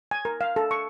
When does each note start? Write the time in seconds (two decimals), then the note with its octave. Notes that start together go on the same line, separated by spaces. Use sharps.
0.11 G#5
0.25 A#4
0.41 F5
0.56 A4
0.71 C#6